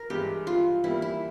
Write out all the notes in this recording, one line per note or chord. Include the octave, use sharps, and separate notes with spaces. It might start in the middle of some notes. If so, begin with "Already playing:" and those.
Already playing: A#4
G2 E3 G#3 G4
F4
E3 G3 A#3 E4
E4